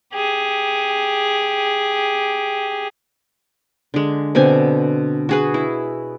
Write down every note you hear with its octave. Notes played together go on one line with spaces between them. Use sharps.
G4 G#4
D3 G#3
B2 D3 C4 G#5
F#4 G#4 B4
E4